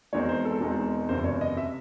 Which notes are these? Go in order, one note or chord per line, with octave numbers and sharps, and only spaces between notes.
E1 E2 D#3 G#3 C4 C#5
C5
A4
E1 E2 D#3 G#3 C4
F#1 E2 C3 C5
C#5
D#5
C3 E5